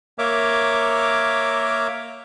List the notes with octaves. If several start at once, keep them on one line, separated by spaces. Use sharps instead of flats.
A#3 A#4 C#5 E5 D6